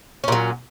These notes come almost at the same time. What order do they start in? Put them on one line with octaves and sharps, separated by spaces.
C#4 A#2 F#3